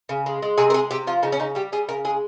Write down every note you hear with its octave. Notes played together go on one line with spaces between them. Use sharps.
C#3
G#3
G#3
C3 G#4
A#4
G#3 G#4
C3 G4
F3 F4
C#3 D#4
C#4
C#3 D#4
G3 G4
G3 G#4
C#3 A#4
G#3 G#4